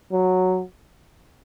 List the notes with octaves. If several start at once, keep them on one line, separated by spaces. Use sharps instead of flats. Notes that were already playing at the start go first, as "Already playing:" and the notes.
F#3